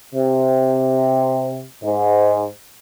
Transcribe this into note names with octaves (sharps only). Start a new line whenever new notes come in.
C3
G#2